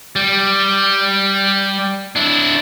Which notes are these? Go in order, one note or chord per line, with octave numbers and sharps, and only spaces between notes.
G3
D4 E4